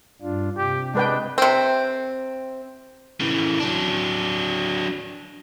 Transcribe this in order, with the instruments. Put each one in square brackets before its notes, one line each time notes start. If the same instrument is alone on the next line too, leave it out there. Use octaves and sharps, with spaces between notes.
[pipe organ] G2 D4 F4
[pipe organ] C3 [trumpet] G4
[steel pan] G#3 B4 G5 [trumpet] D4
[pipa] C3 C4
[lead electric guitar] C#3 E3
F#3 D4